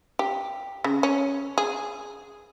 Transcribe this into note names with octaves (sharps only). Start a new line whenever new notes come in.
G4
C#3
C#4
G#4